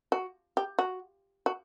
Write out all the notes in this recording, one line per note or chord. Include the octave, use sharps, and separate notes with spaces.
F#4
G4
F#4
F#4